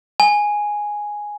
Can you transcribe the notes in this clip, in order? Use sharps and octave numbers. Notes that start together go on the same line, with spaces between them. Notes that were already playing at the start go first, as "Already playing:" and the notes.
G#5